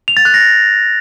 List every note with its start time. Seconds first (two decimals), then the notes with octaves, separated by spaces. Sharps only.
0.08 F7
0.17 A6
0.25 F#6
0.34 A#6